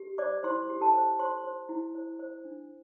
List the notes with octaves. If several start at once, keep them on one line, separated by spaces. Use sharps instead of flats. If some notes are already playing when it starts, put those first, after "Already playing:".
Already playing: G4
C5 D5 D6
E4 C5 C6
G4
A4 A5
C5
C5 C6
C5
E4
C5
C5
D4